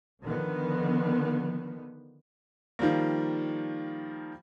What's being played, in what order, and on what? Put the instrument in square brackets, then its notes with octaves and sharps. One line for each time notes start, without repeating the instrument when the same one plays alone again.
[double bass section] D3 D#3 F3 B3
[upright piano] D#3 F3 G3 A#3